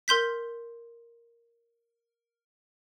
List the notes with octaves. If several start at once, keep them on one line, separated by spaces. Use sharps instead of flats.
A#4 C6 G6 B6